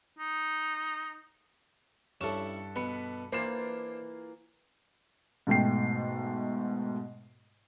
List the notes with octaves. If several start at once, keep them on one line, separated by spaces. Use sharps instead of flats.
D#4
G2 C#4 E4 A4 C#6 E7
B2 B4 B5 C#7
E3 A#3 D4 F4 C5 C6 C7 E7
G#2 B2 A3 G5 C7